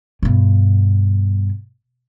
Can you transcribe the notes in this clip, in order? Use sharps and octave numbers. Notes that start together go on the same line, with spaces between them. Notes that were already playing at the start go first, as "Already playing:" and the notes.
G2 B2